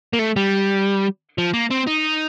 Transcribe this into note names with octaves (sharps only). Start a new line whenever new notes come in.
A#3
A3
G3
F3
A#3
C4
D#4